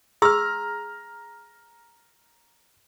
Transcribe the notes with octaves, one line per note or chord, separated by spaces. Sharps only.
G#4 A#5 C6 E6 F6